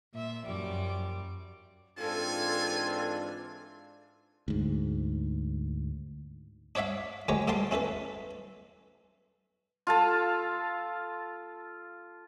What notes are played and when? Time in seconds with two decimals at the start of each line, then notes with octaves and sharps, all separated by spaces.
0.14 A#2 E5 E6
0.46 F#2 F3 G3 D6
1.98 G#2 E3 C4 D4 F4 A4 G#5
4.48 D2 G#2
6.75 D4 C#5 D5 E5 F5
7.28 D2 F#3 G#3 G4 C#5 A#5
7.48 A2 G3 F5 A5 C6 D6
7.71 C#4 E4 A4 B4
9.87 F4 A4 A5